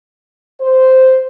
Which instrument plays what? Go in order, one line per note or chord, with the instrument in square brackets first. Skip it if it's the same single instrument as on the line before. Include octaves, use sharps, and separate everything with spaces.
[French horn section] C5